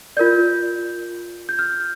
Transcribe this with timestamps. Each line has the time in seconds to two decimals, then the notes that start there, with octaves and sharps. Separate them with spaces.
0.17 F4 A#4 D5 G6
1.49 G6
1.59 F6